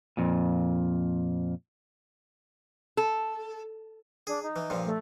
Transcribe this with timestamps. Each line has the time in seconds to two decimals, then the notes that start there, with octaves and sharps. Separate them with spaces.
0.17 F2 A#2
2.97 A4
4.27 D4 G#4
4.43 D#4
4.56 E3
4.70 G2 A#2 F3
4.85 A3